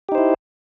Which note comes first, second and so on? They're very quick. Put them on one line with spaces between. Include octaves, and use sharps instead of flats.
G4 D#4 C5 E4